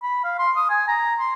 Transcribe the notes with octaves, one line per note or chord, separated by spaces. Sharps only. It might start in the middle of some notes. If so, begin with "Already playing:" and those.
B5
F5
C6
D#6
G#5
A#5
C6